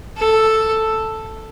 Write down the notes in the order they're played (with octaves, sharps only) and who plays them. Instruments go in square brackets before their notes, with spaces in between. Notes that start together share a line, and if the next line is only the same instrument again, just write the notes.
[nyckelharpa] A4